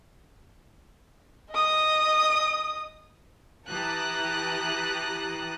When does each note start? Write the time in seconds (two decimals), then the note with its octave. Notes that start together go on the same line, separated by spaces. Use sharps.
1.51 D#5 D#6
3.69 E3 G4 A5 A#5 D#6 F#6